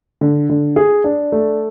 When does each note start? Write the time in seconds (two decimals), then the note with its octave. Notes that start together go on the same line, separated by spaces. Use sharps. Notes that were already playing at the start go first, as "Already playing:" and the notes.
0.21 D3
0.49 D3
0.76 G#4
1.04 D4
1.32 A3